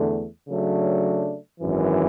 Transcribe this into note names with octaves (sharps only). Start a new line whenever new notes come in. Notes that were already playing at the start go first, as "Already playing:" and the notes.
Already playing: E2 D3 A3
C#3 F#3 A3 D4
G#1 F#2 E3